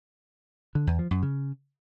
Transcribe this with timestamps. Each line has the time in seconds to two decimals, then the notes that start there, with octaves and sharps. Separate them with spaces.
0.75 D3
0.87 E2
0.99 F3
1.11 F#2
1.23 C#3